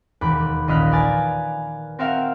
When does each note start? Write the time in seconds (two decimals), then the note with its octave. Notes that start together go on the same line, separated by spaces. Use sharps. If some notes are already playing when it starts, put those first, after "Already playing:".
0.21 E1 D#2 B5 D6 F#6
0.67 D#1 A#1 D#5 F5 B5 F#6
0.91 A#4 B4 D5 G#5 A6
1.99 C4 F#4 A#4 E5 F5 G5